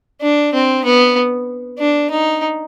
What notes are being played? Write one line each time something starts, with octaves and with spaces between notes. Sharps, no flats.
D4
C4
B3
D4
D#4